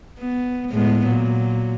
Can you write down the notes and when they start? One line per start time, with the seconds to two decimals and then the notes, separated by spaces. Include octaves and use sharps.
0.19 B3
0.71 A2 G#3 B3
1.06 A#2 F#3